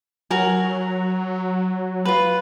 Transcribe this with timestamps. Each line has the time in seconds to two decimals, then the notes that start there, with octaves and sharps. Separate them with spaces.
0.31 F#3 F#4 A#4 G#5
2.05 F4 B4